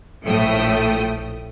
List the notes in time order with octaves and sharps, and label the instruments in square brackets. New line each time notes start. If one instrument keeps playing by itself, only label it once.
[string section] A#1 A2 F3 A3 G5 D#6